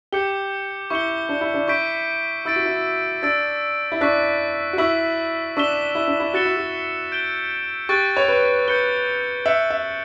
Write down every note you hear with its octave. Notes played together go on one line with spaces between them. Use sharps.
G4 D6 G6 C#7 G7
E4 C#6 G6 C#7 G7
D4
E4
D4
E4 C#6 G6 B6 D7
E4 E6 A6 D7
F#4
E4
D4 E6 A6 D7
E4
D4 C#6 F#6 B6
F#4
E4 C#6 E6 B6 F#7
D4 C#6 E6 B6 E7 G7
E4
D4
E4
F#4 F#6 A6 C#7 E7 G7
E4
F#4
G6 D7 G7
G4 C#6 F#6 A6 D7
C#5
B4
B4 G6 C#7 G7
E5 F#6 C#7 F#7
E5